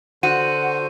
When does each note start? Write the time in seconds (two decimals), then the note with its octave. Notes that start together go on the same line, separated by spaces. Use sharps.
0.23 D3 F#4 C5 D#7